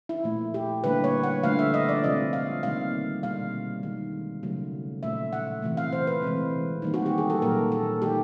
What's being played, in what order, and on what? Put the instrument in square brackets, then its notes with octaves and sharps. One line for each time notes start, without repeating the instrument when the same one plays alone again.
[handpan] E4
A#2 F3 A3
G4
D3 G3 A#3 B4
C#5
F#5
D3 F3 A3 F5
E5
D#5
D5
C3 F3 G#3 D#5
F5
C3 D#3 G3 A#3 F5
B2 G3 A#3 F5
D#3 G#3
C#3 F#3 A3
A#2 F3 A3 E5
F#5
C3 E3 A3
F5
C5
B4
C3 E3 G#3
D#3 G3 A#3
F#4
G4
G#4
A4
A#2 F#3 A#3 A#4
A4
D#3 G#3 G4